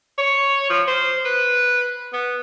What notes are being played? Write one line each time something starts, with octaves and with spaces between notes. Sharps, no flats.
C#5
F3
C5
B4
B3